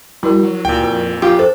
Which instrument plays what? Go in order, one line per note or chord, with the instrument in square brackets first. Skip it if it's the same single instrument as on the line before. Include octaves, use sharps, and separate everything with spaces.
[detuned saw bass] G3 [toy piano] E4 F#4 A#4
[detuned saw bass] F#3
[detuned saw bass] C#2 [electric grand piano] A#2 G5
[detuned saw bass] F2 [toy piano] A#4
[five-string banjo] F4 G4
[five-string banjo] A4 [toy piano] C5